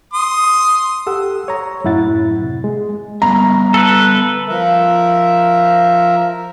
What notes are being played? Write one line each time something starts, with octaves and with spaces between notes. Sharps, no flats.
C6 D#6
G4 A4 F#5 E6
C#5 A#5
F#2 A2 E4 F#5 A6
C3
G#3
G3 B3 E5 A#5
A4 B4
F3 A#4 E5